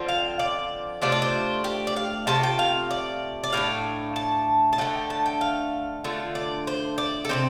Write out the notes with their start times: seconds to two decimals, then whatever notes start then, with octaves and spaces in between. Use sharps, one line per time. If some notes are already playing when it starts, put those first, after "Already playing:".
Already playing: D3 F3 C4 F4
0.09 F5
0.39 D5
1.02 C3 A3 D4 F4 C5
1.12 D5
1.22 C5
1.64 G4
1.87 D5
1.96 F5
2.27 C3 A3 F4 A5
2.43 G5
2.59 F5
2.91 D5
3.44 D5
3.53 A2 A3 D4 F5
4.16 A5
4.73 A5
4.78 D3 A3 D4 F4 G5
5.10 A5
5.26 G5
5.41 F5
6.04 D3 A3 F4
6.35 D5
6.67 C5
6.98 D5
7.25 A4
7.29 C3 G3 C4 C5